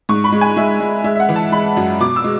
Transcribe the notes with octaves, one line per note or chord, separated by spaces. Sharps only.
G#2 C#6
B5
G#3
G#5
G#3 E5
G#3
G#3 E5
E5
F#5
E3
A5
G#3 B5
F#2
B2 D6
E6
G#3